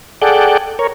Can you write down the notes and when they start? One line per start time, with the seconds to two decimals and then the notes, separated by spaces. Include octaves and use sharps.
0.22 G#4 A4 D5 F#5 G5
0.79 A#4 C#5